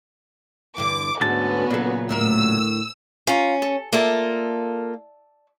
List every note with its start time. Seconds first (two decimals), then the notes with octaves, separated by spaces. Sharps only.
0.77 E2 G2 D3 D6
1.21 D2 G#2 D3 B3 C#4 F#4 A5
1.71 A#2 C#3 F#3 D4 A4
2.09 D2 A2 A#4 E6
3.27 C#4 F4 A#5
3.62 A4
3.93 A#3 F4 A4 D5 E5 A5